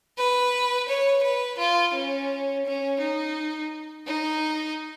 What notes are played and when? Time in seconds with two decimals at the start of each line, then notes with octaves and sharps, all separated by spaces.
0.18 B4
0.89 C#5
1.23 B4
1.58 F4
1.94 C#4
2.66 C#4
3.00 D#4
4.07 D#4